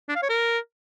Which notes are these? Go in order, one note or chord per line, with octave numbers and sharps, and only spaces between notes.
D4
F5
C#5
A#4